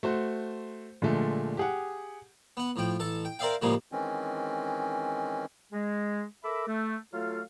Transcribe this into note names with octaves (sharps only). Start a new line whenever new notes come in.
A3 F#4 C5
A#2 D3 F3 G#3 A3
G4 G#4 F#5
B3 F#5
A2 F3 G5
A1 A4 A5
G5
A#4 C5 D5 E5 F5 G5
A2 C#3 F3 G3 G#3 A#3
D#3 E3 G#3 C4 C#4
G#3
A4 A#4 E5 B5 D6 E6
A3
F#3 A3 F4 A4 F5